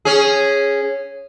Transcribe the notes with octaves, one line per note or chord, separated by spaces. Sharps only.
C#4 G#4